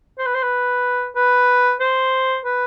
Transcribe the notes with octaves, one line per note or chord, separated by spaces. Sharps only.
C5
B4
C5
B4
B4
C5
B4